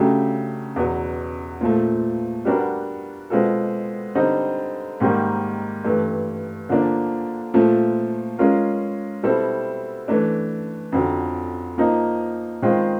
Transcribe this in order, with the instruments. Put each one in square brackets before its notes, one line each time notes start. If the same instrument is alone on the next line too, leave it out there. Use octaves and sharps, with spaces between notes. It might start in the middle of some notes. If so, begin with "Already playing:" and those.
Already playing: [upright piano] C#3 F#3 A3 D4 G4
E2 B2 F#3 B3
A#2 F3 A3
G3 B3 D4 F#4 A#4
B2 G#3 C4 F4 A4
D3 G3 C4 D#4
G#2 D#3 G3 A#3
G2 E3 A3
D3 F3 A#3 D4
A#2 F3 A3
G#3 C#4 F4 A#4
B2 G3 C4 E4 A4
E3 A3 D4
F2 D3 F#3
F3 A#3 D#4
D#3 G#3 C4 F4